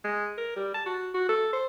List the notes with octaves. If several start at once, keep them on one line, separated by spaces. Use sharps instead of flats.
G#3
A#4
G3
A5
F#4
F#4
A4
C5